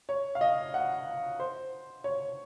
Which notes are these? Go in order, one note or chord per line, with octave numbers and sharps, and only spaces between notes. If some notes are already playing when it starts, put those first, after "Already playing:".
C#5
F5
D#5
F#5
C5
C#5